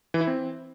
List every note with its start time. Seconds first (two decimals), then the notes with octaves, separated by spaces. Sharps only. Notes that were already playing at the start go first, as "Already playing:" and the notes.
0.14 E3
0.21 E4
0.27 C4